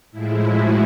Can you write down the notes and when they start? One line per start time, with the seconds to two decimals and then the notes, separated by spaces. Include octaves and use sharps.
0.12 A2 F3 G#3 E4
0.50 E4 F#4